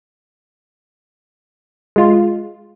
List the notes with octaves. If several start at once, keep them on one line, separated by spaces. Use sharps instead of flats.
G#3 F4